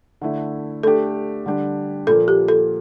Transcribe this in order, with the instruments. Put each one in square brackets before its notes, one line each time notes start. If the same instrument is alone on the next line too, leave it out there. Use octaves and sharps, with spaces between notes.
[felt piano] D3 A3 E4
[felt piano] A3 D4 G4 [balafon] A4
[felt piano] D3 G3 D4 G4
[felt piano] A#2 F3 A#3 [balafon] A4
[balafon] G4
A4